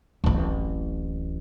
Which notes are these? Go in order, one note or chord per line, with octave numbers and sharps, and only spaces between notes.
D1 A1